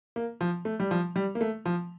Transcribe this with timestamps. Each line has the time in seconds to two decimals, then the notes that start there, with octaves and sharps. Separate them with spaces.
0.16 A#3
0.41 F3
0.65 A3
0.80 G3
0.91 F3
1.16 G3
1.35 A#3
1.41 A3
1.66 F3